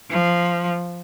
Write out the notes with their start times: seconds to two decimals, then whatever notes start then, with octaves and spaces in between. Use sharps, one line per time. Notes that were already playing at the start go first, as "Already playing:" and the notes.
0.10 F3